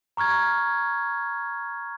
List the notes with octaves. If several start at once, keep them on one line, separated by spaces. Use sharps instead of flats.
A#5 C#6 F6 G#6